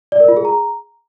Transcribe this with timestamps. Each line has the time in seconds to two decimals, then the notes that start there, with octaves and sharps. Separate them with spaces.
0.12 D5
0.20 A#4
0.28 F4
0.37 G#4
0.45 A#5